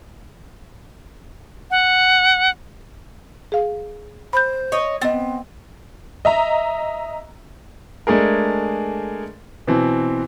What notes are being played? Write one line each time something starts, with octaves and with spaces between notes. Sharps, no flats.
F#5
G#4 F5
C5 B5 G6
C#5 D#5
B3 C4 D#5 A6
D#5 E5 A#5
G#3 A3 D4 G#4 A#4
B2 E3 C4